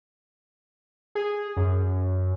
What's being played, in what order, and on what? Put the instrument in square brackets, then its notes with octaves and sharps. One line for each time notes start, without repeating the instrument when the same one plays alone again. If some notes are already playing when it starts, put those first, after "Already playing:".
[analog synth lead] G#4
F#2